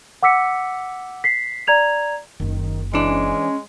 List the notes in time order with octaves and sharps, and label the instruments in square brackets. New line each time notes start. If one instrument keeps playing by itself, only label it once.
[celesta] F#5 D6 E6 B6 C#7
B6 C7
D5 A#5 G#6 F7
[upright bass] F#1 A#3 [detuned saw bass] D#3
[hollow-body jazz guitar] E3 D4 [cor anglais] G#3 [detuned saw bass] C#4